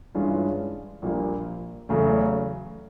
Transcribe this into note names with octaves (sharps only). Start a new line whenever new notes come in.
G2 E3 G#3 C#4 F4
A#1 A#2 G3 A#3
E2 C#3 F#3 A3